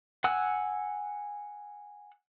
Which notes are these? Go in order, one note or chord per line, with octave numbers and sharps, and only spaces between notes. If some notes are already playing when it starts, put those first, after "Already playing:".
F#5 G#5 E6 F#6